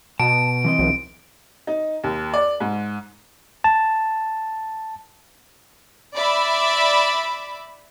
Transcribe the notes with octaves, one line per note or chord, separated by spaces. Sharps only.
B2 A5 D7
E3 C4 D#5
B1
D#4
D#2
D5
G#2
A5
D5 E5 B5